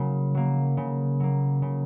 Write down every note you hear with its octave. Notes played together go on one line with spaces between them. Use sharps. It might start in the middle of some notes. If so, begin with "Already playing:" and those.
Already playing: C#3 F#3 A#3
F#3 A#3
C#3
F#3 A#3
C#3